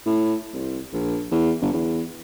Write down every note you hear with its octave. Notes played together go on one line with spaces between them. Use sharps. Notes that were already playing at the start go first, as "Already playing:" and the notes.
A2
C2
A#1
E2
G1
E2